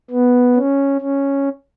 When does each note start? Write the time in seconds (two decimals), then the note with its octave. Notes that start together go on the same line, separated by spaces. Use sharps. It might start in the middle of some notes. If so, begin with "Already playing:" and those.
0.10 B3
0.56 C#4
1.01 C#4